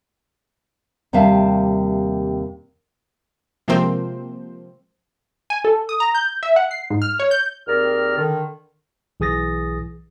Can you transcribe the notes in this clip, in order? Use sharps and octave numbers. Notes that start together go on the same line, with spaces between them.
D#2 C3 G3 E5 F5 A5
C3 F3 G#3 A#3 C4 C5
G#5
A4
D#6
A#5
G6
E5
F#5
C7
G#2
F6
C#5
G6
D#2 C4 G#4 A#4 D5 F6
D3 D#3
B1 E3 G#4 D#6 A6 A#6